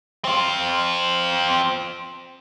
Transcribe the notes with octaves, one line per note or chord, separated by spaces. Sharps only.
C4 F4